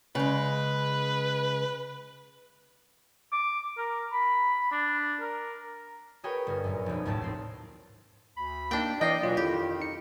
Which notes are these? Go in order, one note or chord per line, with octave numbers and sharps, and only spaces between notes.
C#3 G#3 B4
D6
A#4
B5
D4
A#4
F#4 G#4 A#4 B4 C#5 G5
G1 A#4
F#2 A#2
F1 B1
G#1 D#2 A2 A3 A5
C4 C7
D2 B5
A#3 D4 D#4 G5
E3 D5 D#5 G5 C7
B2 E3 F#3 F4 D#5
F2 D#3 E4 G4
D#4 C#7